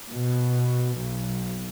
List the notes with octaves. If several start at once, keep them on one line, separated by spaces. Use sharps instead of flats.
B2
B1